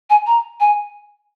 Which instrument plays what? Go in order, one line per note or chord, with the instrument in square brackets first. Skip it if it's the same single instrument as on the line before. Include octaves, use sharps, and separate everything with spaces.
[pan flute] G#5
A#5
G#5